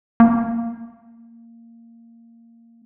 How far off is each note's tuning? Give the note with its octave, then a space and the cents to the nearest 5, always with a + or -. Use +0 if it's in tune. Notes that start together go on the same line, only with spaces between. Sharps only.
A#3 -15